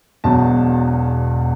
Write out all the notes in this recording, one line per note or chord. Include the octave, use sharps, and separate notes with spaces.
E1 E2 B2 F#3 A5